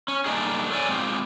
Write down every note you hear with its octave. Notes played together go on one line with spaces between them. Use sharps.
C#4
G3 A3 A#3 D4 D#4 G#4
A4 C#5 D5 G#5
G#3 C4 F4 G4 G#4